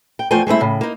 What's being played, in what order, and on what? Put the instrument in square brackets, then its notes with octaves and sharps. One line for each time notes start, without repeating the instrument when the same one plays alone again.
[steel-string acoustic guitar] G5
E2 F3 A3 C5 G5 G#5
G#3 A3 C4 E4
A2 C#3
A#3 D#4